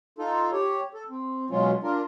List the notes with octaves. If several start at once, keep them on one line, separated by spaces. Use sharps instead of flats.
D#4 F4 A4
G4 C#5
A4
C4
B2 F#3 G#3 C#4 F4
D4 F4 A#4